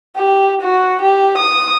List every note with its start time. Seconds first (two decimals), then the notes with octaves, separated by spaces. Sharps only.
0.16 G4
0.61 F#4
1.02 G4
1.38 D#6